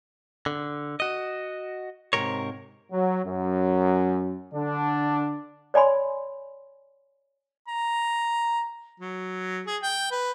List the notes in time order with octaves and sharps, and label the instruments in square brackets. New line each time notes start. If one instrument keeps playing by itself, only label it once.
[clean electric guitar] D3
F#4 D#5
G#2 C3 D#3 F#3 A#4 C#5
[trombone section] F#3
F#2
D3 D4
[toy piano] C#5 D5 G#5 B5 C6
[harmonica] A#5
F#3
G#4
G5
B4